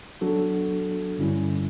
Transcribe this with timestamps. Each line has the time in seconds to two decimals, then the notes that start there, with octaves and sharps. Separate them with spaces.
0.21 F#3 B3 D4 F#4 A4
1.17 G2 D3 G3 C#4 E4